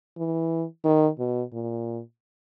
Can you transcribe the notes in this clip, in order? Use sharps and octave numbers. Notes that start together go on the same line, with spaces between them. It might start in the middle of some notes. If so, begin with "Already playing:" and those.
E3
D#3
B2
A#2